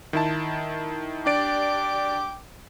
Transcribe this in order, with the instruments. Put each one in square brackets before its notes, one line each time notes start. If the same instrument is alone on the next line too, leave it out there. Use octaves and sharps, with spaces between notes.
[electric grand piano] D#3 E4 A5
[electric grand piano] D4 D5 D7 [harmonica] G5 D6